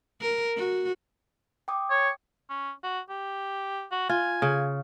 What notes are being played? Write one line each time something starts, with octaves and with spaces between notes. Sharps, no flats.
A#4
F#4
G5 D6 D#6
C#5
C#4
F#4
G4
F#4
F4 G#5
C#3